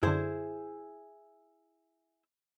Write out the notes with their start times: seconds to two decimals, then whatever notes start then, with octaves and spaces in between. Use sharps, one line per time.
0.03 F#2 D3 E4 G#4 C5